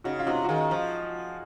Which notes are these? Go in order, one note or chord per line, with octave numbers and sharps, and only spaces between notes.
C#3 D#4 F#4
F4
C3 D#4 F#4
F#4
D#3 F4 G#4
F3